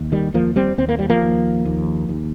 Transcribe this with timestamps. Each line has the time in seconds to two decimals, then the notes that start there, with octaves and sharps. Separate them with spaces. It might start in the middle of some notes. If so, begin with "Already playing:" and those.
Already playing: D#2
0.12 D#3 G3
0.34 D#2 F3 A#3
0.56 G3 C4
0.78 D#2 C4
0.89 A#3
0.99 G3
1.10 F3 A#3
1.21 D#2
1.65 D#2
2.09 D#2